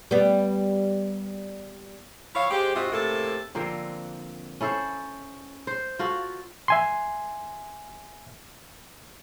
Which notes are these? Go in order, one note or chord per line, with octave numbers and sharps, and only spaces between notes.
G3 B3
F3 E4 C#5 F5
G#3 G4 C5
G#2 C3 F4 F#4 D#5 E5
A2 C3 A#3 A4
D3 F3 A#3 C4
C#4 E4 A4 C5
C5
F4 F#4 A4
E5 G#5 C6